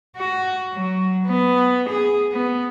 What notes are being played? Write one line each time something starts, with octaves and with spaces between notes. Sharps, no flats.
F#4
F#3
B3
G#4
B3